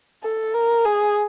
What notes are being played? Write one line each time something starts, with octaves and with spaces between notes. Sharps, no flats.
A4
A#4
G#4